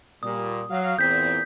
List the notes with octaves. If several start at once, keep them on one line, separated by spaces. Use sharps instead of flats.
A#2 G3 D#6
F#3 F5
E2 A#2 C4 G6 B6